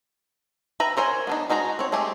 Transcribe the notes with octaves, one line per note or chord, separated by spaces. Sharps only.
B4 E5 G5 A#5
A#4 C5 C#5 G#5
B3 D4 D#4
G#3 D#4 F#4 B4 A#5
C4 C#5
G#3 A3 C4 G4